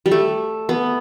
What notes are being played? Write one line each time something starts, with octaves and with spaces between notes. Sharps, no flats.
G3
A3
B3